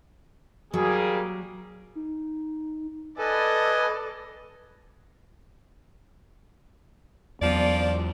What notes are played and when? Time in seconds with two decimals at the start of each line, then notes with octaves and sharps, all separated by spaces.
0.74 F#3 G3 A#3 G#4
1.95 D#4
3.18 A4 B4 D5 D#5 G#5 B5
7.41 E2 F3 F#3 D5